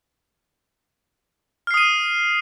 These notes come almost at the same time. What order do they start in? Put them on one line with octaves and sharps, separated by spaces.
F6 C7 D#6 D#7